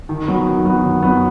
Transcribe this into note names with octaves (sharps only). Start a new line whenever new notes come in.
D#3
F#3 B3
D#3
F#3 B3
D#3
F#3 B3